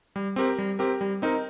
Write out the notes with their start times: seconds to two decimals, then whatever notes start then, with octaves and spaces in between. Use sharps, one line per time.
0.16 G3
0.36 C4 G4 A#4
0.58 G3
0.79 C4 G4 A#4
1.01 G3
1.22 C4 D#4 A#4